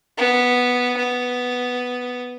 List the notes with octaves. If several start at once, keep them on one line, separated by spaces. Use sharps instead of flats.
B3
B3